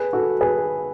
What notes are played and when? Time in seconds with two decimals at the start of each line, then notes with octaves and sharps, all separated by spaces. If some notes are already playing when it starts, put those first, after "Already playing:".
Already playing: G#4 B4
0.13 F#4 A4
0.41 G#4 B4